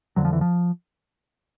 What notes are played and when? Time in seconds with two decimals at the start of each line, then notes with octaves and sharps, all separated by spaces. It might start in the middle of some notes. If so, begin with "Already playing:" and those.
0.16 F2 D3 F#3
0.25 F3
0.33 E3
0.41 F3